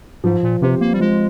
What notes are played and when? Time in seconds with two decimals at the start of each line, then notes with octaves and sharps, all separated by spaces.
0.24 G#2 F3
0.43 A#2
0.61 C3 C4 G4 C5
0.81 A#3
0.93 G3
1.00 F3 G#3